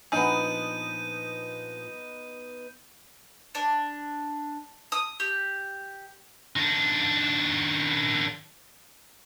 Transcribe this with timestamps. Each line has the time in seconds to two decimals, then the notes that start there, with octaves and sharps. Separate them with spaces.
0.12 A#2 F3 B3 D4 D#4 G#5 G6 D#7
3.55 D4
4.92 D#6
5.20 G4
6.56 D#3 D4